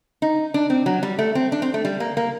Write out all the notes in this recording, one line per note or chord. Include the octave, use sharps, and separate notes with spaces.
D#4
D4
C4
F#3
G3
A3
C4
D4
C4
A3
G3
A#3
A#3